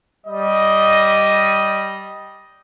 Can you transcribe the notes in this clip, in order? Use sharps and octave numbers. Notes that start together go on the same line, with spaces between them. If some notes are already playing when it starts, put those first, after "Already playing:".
G3 D#5